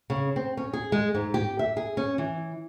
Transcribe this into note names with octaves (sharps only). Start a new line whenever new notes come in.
C#3
C4
C#4
G#4
G#3
G#2
G4
E5
G#4
C#4
E3